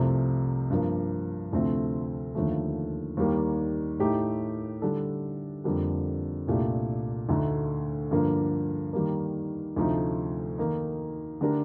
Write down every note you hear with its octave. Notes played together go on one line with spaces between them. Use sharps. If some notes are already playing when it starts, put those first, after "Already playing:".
Already playing: C2 C3 F3 A3 C4
G2 F3 A#3
D2 C3 F3 A3 C4
D#2 D3 F3 A3
D#2 D#3 G3 A#3
A2 A3 D#4 G4
D3 G3 D4 A4
F2 D3 G3 A#3
C2 A#2 A3 D4 G4
D2 D3 A3 D#4
G2 D3 F3 A#3
D#3 G3 A#3
D2 C3 F3 A3 D#4
D#3 A#3 D#4
D3 A3 D4 G4 A#4